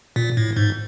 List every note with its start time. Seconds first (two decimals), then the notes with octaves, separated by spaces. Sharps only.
0.16 A#2
0.37 A2
0.56 G#2